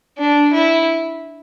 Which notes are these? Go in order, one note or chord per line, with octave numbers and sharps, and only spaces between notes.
D4
E4